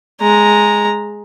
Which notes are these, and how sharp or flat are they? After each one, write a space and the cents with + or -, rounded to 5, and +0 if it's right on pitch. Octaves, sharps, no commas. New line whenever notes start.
G#3 +0 A#5 +0